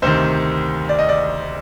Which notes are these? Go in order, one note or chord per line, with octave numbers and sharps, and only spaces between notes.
D2 C3 D#3 C5
D5
D#5
D5